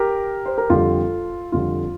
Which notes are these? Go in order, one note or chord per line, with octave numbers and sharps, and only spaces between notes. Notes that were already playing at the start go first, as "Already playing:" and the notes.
Already playing: G4 A#4
C5
A#4
F2 D3 G3 F4 A4
F2 D3 G3 F4